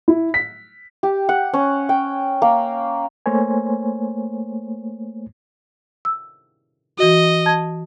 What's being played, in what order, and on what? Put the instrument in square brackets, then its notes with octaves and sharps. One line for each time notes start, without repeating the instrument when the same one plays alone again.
[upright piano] E4
B6
[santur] G4
F#5
C#4
G5
A#3
[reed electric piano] A3 A#3 C5 C#5 G#5
[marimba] E6
[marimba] E3 F#4 [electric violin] D#5
[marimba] A5 G#6